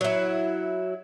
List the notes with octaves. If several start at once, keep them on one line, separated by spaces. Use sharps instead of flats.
F#3 E4